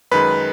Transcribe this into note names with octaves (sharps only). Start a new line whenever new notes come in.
F#2 D#3 G#3 B4 B5